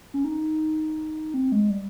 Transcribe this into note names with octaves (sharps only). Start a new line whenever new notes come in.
C#4
D#4
C4
G#3
G3